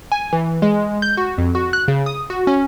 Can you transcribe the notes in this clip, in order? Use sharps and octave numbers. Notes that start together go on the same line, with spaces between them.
G#5
E3
G#3
G6
F#4
F2
F#4
F#6
C#3
D#6
F#4
C#4